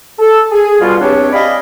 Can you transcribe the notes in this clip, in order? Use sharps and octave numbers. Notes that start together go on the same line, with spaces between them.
A4
G#4
B2 G3 B3 F4
E2 C4 D4 G4 C#5
D5 D#5 F5 G#5 B5